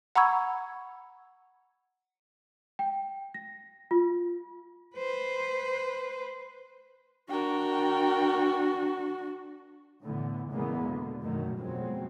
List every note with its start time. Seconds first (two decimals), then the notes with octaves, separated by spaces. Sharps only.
0.16 F#5 A#5 B5 C#6 E6 G#6
2.79 G5
3.34 A#6
3.91 F4
4.96 B4 C5
7.29 D4 F#4 A#4 G5
10.03 A2 D3 E3 B3
10.51 E2 C#3 E3 G#3 A#3 B3
10.84 B2 D3
11.22 F#2 B2 D#3 F#3 A3
11.56 G1 F2 B2 F#3 G#3 C4